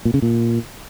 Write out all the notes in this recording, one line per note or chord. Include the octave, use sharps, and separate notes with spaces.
A#2
C#3
A#2